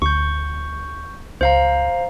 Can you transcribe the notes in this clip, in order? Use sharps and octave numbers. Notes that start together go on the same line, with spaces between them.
D2 C#6 G6
C#2 C5 F5 A#5